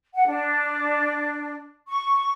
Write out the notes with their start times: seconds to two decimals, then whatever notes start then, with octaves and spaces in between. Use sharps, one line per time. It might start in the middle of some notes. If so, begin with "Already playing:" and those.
0.14 F#5
0.26 D4
1.88 C#6